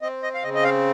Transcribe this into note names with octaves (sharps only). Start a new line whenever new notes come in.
C4 D#5
D#5
F5
C#3 D#5
D#5
F5